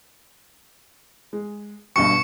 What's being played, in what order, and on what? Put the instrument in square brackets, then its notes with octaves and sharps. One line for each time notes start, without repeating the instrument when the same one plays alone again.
[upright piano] G#3
[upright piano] G1 G2 B2 [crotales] C#6 C#7